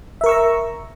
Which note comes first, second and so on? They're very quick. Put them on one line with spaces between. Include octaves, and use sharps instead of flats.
E5 A#4 C#6 E6 A#5